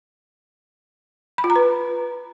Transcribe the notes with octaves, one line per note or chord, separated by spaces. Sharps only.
B5
F4
A#5
B4